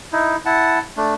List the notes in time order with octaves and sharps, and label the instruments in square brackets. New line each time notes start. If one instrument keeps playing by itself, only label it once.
[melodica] D#4 E4
E4 F#5 A5
A3 D4